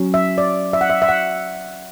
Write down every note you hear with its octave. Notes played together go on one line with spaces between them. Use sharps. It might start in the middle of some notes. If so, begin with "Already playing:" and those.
Already playing: F#3 C#4
E5
D5
E5
F#5
E5
E5
F#5